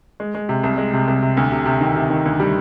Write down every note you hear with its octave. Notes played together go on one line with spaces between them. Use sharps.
G#3
G#3
C3
C2
G#3
C3
C2
C3
D2
C3
C3
D#3
C3
D#3
D2
G3